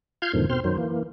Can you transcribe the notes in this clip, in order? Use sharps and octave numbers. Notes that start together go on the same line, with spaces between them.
F4 F5 F6 G6 G#6
E2 G#2 B2 D3 D#3 F3
B2 C4 C5 C6 F6
F#2 D#3 F#3 C5
E3 A#3